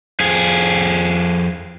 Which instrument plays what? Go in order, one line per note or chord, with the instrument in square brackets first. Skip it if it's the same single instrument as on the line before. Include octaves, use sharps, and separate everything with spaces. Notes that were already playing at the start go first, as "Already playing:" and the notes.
[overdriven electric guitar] F2 G#4